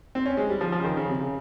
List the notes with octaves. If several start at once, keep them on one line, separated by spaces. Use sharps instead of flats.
C4
C#4
G#3
G3
F3
F3
C#3
D#3
C#3
C3
C#3